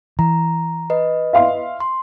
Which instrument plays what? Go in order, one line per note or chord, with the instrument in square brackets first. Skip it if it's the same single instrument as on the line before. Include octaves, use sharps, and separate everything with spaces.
[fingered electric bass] E3 [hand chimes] A#5
[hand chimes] B4 D#5
[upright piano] E5 F5 C6
[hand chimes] C6